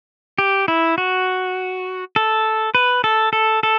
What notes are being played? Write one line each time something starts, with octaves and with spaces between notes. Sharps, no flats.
G4
E4
F#4
A4
B4
A4
A4
A4